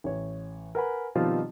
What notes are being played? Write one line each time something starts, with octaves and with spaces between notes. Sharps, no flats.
A1 C#5
A#4 B4 F#5 G#5 B5
B2 D#3 F3 G3 C4 F4